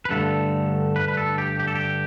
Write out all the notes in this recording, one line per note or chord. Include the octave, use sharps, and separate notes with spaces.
B4
G2 D3 A3 A4
B4
B4
A4
G4
G4
A4
G4